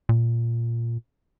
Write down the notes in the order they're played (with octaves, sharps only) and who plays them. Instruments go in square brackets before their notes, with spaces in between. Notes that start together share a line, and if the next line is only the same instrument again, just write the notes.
[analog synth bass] A#2